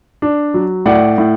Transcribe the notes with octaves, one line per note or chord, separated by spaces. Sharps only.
D4
F#3
A2 D5 F#5
A2